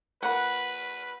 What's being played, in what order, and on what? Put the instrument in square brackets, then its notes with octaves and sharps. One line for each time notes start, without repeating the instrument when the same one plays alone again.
[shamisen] F3 A#3 B5 [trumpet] B4 [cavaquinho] F#5